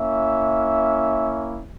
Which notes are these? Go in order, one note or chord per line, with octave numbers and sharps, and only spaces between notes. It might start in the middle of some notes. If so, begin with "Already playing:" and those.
Already playing: A#3 C#4 E4 E5